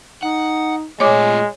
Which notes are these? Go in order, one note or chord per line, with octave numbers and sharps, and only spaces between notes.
D#4 F#5
A#2 G#3 A3 F4 C#5 G#5 D6